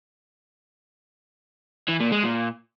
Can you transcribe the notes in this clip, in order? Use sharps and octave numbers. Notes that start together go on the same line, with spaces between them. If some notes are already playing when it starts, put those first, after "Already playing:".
E3
A#2
G#3
A#2